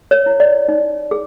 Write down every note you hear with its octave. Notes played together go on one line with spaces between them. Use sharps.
C#5
E4
D5
D#4
G#4